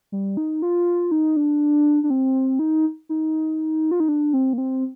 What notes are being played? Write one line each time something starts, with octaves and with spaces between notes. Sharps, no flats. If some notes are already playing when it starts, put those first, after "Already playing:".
G3
D#4
F4
D#4
D4
D4
C4
D#4
D#4
F4
D#4
D4
C4
A#3
C4